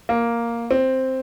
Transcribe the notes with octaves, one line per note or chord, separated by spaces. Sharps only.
A#3
C4